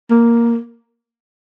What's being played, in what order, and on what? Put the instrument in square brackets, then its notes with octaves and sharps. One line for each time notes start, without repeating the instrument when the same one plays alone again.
[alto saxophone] A#3